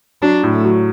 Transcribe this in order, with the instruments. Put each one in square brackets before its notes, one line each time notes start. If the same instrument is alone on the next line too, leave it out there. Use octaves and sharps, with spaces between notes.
[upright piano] F#3 [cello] D4
[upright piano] A2
[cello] A3
[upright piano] F#3